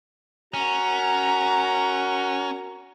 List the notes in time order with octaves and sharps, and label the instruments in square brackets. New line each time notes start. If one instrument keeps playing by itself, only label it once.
[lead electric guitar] C#4 [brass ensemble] F#4 A#4 F#5 [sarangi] A#5